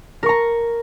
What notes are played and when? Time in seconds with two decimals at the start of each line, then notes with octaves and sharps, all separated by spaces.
0.23 A#4
0.26 C#6
0.29 A#5